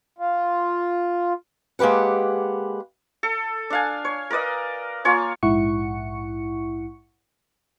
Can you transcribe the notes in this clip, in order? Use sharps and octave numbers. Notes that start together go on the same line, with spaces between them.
F4
G#3 A#3 G4 B4 F#5
A4
D4 F5 G#5
C#5
A#4 B4 D5 D#5
A#3 F4 C#5 G#5
A#1 G#2 E4 F#5 C#6 C#7